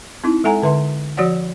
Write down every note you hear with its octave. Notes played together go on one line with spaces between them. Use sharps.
C4 D#4 E4
G#3 A4 E5 F#5 G#5 A#5
D3 B4 E5 C6
F3 F#4 C#5 D5 F#5